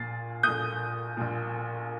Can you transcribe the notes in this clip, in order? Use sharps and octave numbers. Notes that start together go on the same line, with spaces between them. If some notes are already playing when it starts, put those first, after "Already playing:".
Already playing: A#1 A#2 A6 C7
A#1 A#2 D#6 G6
A#1 A#2